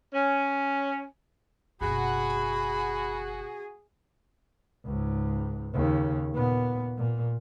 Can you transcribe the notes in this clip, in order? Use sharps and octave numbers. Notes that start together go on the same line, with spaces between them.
C#4
F#1 B2 F#4 G#4 B5
C#2 G#2
D#2 C#3
A#2 B3
A#2